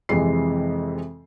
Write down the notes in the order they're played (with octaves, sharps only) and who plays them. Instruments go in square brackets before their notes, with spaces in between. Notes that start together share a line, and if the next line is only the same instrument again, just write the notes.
[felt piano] F2 C3 E3 G#3 C7